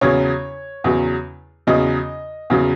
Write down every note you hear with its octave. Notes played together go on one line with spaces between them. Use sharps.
E2 C#3 F#3 C#5
E2 C#3 F#3
E2 C#3 F#3 D#5
E2 C#3 F#3